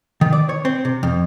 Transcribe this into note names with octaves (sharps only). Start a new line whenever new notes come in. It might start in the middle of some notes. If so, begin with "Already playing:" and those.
D#3
D5
C#5
C4
C3
F2